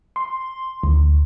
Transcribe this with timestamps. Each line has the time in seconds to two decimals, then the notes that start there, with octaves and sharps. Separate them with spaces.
0.16 C6
0.83 D2